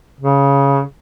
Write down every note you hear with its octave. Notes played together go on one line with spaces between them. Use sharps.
C#3